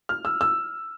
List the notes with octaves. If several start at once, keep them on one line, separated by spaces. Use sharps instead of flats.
F6
E6
E6